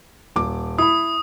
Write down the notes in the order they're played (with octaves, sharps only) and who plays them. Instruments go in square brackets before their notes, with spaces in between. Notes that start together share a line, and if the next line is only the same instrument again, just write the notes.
[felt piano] D#1 D6
[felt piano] E4 B5 [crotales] D#6